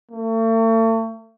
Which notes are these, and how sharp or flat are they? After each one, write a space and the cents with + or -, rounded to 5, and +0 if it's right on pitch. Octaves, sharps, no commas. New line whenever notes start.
A3 +40